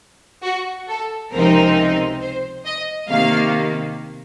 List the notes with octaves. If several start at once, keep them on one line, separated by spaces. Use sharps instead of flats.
F#4
A4
C#2 C3 F3 C4 D#4 A#4
C5
D#5
C3 D#3 A#3 F5